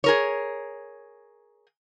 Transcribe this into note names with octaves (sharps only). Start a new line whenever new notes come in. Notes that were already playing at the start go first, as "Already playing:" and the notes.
G#4 A#4 C#5